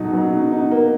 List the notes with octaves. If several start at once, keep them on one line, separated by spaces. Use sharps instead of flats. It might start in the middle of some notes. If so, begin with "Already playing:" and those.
Already playing: B2 F#3 D#4
F#3
D#4
D#4
A#3